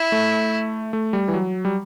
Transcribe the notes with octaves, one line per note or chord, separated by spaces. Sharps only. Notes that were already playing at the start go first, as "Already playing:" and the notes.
Already playing: E4
A3
A3
G3
E3
F#3
G3